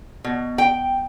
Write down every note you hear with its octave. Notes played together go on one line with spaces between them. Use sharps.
B2
G5